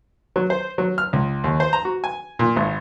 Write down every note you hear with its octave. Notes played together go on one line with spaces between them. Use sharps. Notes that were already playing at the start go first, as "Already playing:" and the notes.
F#3
C5
F#3
F6
C#2
D#2
C5
A#5
F#4
G#5
A#2
G#1